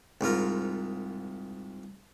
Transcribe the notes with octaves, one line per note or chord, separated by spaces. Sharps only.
C2 G#2 F4 A#4